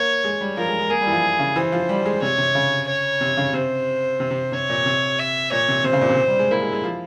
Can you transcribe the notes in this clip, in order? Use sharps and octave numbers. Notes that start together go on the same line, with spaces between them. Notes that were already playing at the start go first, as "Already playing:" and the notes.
Already playing: A#3 C#5
G#3
G3
F3 A#4
G#3
G#3
A#3 G#4
G3
E3
F3
C#3
E3 C5
F3
G3
G#3
C3 C#5
C3
C#3
C#5
C3
C#3
C3 C5
C3
C3
C3 C#5
A#2
C3
E5
A#2 C#5
C3
C3 C5
C#3
A#2
C3
G3
G#3
A#3 E4
G#3
G#3
F3